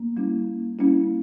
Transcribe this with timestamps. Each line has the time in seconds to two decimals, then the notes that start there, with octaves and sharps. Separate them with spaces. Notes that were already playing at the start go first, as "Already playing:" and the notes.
Already playing: A#3
0.17 G3 C#4 E4
0.79 G3 C#4 E4